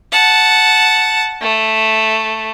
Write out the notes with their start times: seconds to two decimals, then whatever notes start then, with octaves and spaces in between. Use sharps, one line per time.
0.12 F#5 A5
1.42 A3